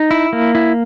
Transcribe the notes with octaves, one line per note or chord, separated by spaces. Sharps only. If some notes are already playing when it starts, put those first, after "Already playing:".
Already playing: D#4
E4
A#3
E4